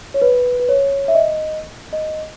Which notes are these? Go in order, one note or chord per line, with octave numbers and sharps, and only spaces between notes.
C#5
B4
B4
C#5
E5
D#5
D#5